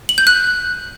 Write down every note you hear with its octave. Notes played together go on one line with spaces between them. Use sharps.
F#7
G6
F#6